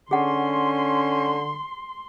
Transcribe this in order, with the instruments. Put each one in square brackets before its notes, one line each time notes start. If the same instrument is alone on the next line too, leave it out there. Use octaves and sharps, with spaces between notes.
[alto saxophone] D3 [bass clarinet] C#4 [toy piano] G#4 F#5 [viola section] C6